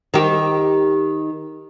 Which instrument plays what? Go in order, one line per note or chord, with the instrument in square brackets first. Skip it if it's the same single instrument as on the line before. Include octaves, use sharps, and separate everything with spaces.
[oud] D#3 G4